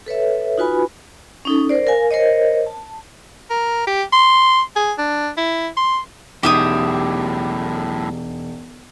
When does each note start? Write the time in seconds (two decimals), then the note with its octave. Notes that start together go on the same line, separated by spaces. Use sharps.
0.06 A4 B4 C#5 E5
0.58 D#4 F4 F#4 B4 G#5 B5
1.45 C#4 D#4 A4
1.69 A#4 C5 D5
1.87 A#4 F5 G#5
2.11 A#4 C5 C#5 D#5
2.66 A5
3.50 A#4
3.87 G4
4.13 C6
4.76 G#4
4.98 D4
5.37 E4
5.77 C6
6.43 E1 F#2 A2 D#4 G4 E5 D#6